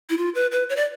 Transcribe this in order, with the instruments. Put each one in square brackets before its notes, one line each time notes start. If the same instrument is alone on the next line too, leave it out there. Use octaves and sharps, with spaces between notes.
[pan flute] E4
F4
B4
B4
C#5
D5